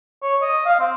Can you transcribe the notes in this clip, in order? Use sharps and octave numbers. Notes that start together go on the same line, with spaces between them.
C#5
D#5
F5
C4